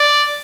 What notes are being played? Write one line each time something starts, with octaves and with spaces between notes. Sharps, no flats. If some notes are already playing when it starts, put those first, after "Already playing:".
Already playing: D5